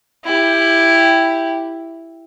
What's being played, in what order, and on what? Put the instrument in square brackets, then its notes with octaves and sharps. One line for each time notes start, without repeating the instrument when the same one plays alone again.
[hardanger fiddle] E4 G4